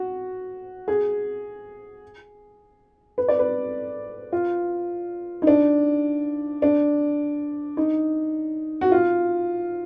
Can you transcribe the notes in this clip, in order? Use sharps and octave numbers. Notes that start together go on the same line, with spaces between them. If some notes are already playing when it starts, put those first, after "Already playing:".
Already playing: F#4
G#4
B4
D5
B4
F4
D#4
D4
D4
D#4
F#4
F4